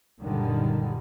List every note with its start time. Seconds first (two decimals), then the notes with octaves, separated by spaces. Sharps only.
0.21 F#1 C#2 A#2 D3 D#3 G3